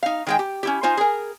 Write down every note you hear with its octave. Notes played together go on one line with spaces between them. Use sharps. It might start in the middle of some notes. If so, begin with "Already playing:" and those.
D#4 F5
D#3 G#3 G5
G4
C#4 E4 G4
D#4 F4 C5 G#5
G#4 A#4